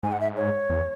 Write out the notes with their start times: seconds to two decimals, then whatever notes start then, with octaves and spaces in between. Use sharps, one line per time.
0.03 G#2 G#5
0.12 F#5
0.20 E5
0.37 C#5
0.70 E2